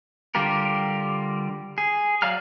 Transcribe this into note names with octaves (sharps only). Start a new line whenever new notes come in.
D3 G3 F4 G4 A#4
G#4
F#3 D5 F5 A#5 F6